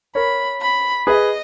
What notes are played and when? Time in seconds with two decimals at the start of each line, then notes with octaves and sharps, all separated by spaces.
0.15 A#4 C#5 B5
0.61 B5
1.07 G#4 B4 D#5